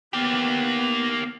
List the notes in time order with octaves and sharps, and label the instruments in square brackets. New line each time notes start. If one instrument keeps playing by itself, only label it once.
[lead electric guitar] A#3 G4 [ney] B3